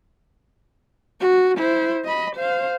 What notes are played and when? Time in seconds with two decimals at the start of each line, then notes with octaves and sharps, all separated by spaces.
1.21 F#4
1.58 E4 C5
2.05 D#5 B5
2.36 C5 F5